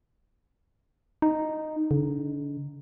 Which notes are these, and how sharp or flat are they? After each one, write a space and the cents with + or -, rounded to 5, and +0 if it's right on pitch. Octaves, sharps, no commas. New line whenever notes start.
D#4 -5
D3 -40